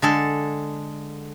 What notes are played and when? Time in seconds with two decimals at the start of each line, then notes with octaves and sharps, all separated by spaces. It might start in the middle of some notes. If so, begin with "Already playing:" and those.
0.02 D3 G#3 A4